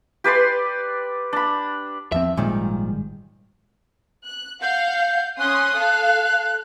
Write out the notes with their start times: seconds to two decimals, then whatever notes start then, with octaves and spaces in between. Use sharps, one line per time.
0.24 G4 B4 D5 C6
1.33 D4 B5
2.12 E2 F3 C4 E5
2.37 G#1 A#2 D#3 F3 G3 G#3
4.26 F#6
4.62 F5 F#5 G6
5.39 C#4 C6 D#6 F#6
5.76 A4 F5